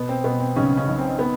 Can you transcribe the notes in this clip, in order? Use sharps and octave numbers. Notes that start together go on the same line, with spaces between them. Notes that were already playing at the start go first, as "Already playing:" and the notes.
Already playing: B2 B3
C4
B2 B3
C4
B1 C#3 C#4
C#3 C#4
B1
C4
B3